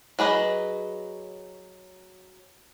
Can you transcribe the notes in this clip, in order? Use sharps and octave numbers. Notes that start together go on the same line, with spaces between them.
F#3 G#4 B4 D#5